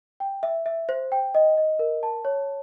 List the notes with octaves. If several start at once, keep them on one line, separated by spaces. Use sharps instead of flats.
G5
E5
E5
C5
G5
D#5
D#5
A#4
A5
C#5